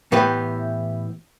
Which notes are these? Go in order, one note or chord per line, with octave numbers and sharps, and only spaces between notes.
A2 E3 B3 G4 B4